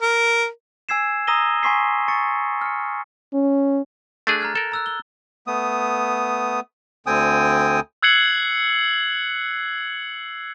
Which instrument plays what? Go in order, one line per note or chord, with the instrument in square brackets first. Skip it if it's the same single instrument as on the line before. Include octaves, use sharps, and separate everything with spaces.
[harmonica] A#4
[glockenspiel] G#5 E6 G#6 C7 E7
A#5 D#6 E6 A#6 D#7 G7
G#5 C6 C#6 B6 C7
C#6 A6 C#7
F6 C#7
[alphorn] C#4
[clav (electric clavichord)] A3 D4 G#4 [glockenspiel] F#6 A6
[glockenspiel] A#5 F6 G#6
[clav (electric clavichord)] A4 A#4
[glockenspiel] A#5 E6 F#6
G7
[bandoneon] A3 B3 D#6
D2 D3 C4 G5 G#5 D#6
[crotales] E6 F#6 G#6 C7 C#7 F#7